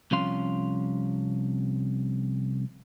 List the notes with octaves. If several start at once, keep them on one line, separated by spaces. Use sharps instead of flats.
C2 C3 F3 C#4 F5 C6